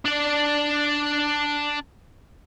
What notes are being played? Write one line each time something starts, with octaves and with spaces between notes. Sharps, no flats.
D4 D5